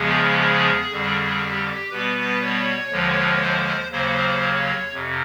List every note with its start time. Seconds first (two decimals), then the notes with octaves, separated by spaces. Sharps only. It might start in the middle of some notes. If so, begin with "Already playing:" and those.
Already playing: E2 C#3 F3 G#3 B3 G#4
0.40 G#4
0.91 F2 D3 G3
1.40 G4
1.91 B2 G3 B3 B4
2.42 C#5
2.91 D#2 D3 F3 G#3
3.41 C5
3.92 D#2 C#3 F#3 A#3 C5
4.42 C#5
4.93 F2 C3